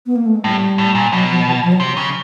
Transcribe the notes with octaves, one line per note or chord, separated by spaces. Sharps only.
B3
A#3
A3
G#3
A2 G3
A2
A#2
B2 F#3
F3
E3
F3
F#3
C3
C#3